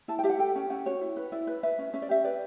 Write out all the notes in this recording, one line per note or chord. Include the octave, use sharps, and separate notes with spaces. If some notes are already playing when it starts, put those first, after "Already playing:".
E4 A5
G5
G4 E5
F#5
A4 G5
C#4
C#4 F#5
F#4 C#5
E4
B4
E4 D5
B4
B4 E5
C#4
C#4 E5
D5
G4 E5
B4 D5